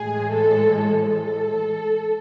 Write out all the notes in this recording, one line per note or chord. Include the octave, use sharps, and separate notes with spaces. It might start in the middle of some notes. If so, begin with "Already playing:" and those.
Already playing: A2 E3 G#3 G#4
A4
A4